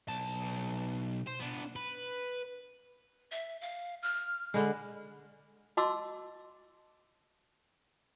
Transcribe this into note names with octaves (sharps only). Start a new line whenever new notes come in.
B1 A5
C5
B3 D4
B4
E5
F5
F6
D3 G#3 B5
F#4 D#5 A5 C6 D6 E6